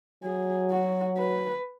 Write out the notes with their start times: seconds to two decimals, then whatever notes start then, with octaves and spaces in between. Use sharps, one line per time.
0.23 F#3 G#4
0.71 F#4
1.18 B4